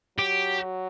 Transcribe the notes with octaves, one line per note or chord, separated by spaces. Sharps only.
F#3 G4